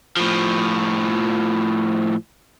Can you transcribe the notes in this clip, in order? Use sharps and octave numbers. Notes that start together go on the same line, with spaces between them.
A2 F3